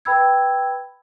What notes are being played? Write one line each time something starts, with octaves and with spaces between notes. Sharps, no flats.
B4 G5 B5 E6 G#6